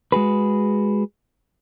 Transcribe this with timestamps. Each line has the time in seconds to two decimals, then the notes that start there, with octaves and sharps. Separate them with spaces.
0.12 G#3 F#4 G#4 B4